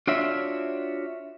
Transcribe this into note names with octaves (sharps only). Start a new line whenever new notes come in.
D4 F4 F#4 C#5 D5 E5